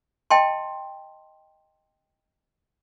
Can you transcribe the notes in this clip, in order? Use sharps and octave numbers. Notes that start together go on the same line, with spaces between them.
D#5 G5 A5 C6